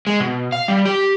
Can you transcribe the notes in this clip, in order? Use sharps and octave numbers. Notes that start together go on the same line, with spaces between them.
G#3
B2
F5
G3
G4